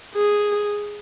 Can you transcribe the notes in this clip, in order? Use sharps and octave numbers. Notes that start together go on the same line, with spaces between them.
G#4